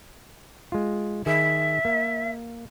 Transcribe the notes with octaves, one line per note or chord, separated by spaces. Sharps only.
G#3 F4
D#3 G#4 E5
A#3